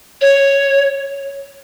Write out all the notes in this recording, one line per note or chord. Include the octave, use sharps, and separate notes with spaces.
C#5